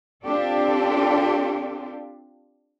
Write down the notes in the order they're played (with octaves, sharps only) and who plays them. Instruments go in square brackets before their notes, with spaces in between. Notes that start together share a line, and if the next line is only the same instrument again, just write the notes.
[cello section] C4 D4 F4 G4 A4 D5